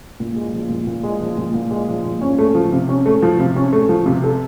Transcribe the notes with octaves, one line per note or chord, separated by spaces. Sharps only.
A#2
G#3
F3
A#2
A#2
G#3
F3
A#2
A#2
G#3
F3
A#2
C#4
A3
F3
C3
C#4
A3
F3
C3
C#4
A3
F3
C3
A4